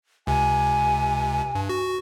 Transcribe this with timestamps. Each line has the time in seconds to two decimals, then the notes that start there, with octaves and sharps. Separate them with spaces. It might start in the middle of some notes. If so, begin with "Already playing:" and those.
0.27 C#2 C3 G#5
1.55 G2
1.69 F#4